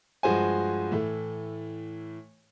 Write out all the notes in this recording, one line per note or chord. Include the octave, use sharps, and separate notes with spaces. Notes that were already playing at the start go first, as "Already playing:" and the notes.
G2 F3 G#3 F#4 C5 G#5
A2 E3 A3